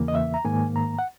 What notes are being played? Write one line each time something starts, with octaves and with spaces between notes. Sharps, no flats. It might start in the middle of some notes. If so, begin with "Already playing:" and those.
Already playing: E2 C#3 E3 A#3
D#5
E5
A#5
G#2 D#3 A#3 G#5
A#5
F#5